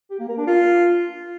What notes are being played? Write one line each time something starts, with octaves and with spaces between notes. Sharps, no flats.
G4
A#3
A#4
D4
F4